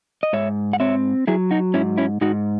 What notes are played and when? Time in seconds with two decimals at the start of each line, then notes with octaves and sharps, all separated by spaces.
0.23 D#5
0.33 G#2 C#5 E5
0.73 F#5
0.80 C4 C#5 E5
1.27 F#3 E4 G#4
1.51 D#4 F#4
1.74 G#2 C#4 E4
1.98 C#4 E4
2.21 G#2 D#4 F#4